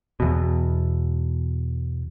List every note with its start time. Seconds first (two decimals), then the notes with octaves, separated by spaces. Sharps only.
0.20 E2 B2